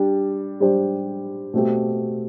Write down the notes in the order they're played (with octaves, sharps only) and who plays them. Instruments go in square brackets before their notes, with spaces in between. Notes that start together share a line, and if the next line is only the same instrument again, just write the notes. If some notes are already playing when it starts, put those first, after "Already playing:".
Already playing: [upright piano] G3 D4 G4
G3 D4 G4 C5
B2 A3 C4 G4